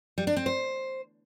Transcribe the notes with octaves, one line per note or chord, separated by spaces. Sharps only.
G3
D4
C4
C5